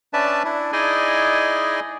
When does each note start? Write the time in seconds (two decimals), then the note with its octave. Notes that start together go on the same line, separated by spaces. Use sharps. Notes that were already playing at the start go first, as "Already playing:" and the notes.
0.13 C#4 D4 B4 D5 E5 A5
0.45 D4 E4
0.72 D#4 E4 G#4 D5 D#5 G#5